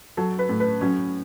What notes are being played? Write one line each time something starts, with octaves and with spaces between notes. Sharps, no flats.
F#3 A4
B4
A2
B4
F#3 C#4